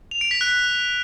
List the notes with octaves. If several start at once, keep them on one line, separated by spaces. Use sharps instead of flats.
F7
D7
B6
F#6